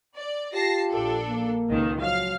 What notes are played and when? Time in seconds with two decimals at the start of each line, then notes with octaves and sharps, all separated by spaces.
0.15 D5
0.53 F4 G4 A5 A#6 C7
0.90 A#1 D4 A4
1.29 A#3
1.69 C#2 A#2 D#3
2.02 F3 F#3 F5 F6